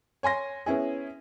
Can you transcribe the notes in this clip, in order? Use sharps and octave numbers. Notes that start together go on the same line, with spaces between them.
C#5 G#5 C6 A#6
B3 C#4 E4 G#4